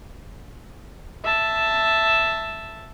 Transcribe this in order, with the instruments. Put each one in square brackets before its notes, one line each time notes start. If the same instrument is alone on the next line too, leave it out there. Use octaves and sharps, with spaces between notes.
[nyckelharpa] E5 A5